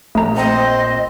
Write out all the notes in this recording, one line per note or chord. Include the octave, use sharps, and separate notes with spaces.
A#1 A3 A#5
C4 D#5